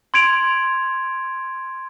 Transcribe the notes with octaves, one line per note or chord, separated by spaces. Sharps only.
C6 G#6 D7 F7